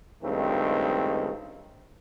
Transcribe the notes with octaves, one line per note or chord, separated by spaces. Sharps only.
C#2 G2 D#3 A3 C4